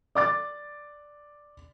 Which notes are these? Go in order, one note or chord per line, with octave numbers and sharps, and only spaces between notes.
D5 D6 A6